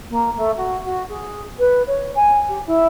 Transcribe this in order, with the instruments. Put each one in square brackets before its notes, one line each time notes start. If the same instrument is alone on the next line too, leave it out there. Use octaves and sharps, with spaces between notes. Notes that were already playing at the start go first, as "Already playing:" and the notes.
[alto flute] A#3
A3
F#4
F#4
G#4
B4
C#5
G#5
G4
E4